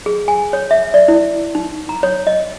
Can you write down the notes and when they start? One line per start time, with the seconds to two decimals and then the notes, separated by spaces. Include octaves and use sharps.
0.06 G#4
0.28 G#5
0.53 C#5
0.71 E5
0.94 D5
1.08 E4
1.55 D#4
1.89 A#5
2.03 C#5
2.27 D#5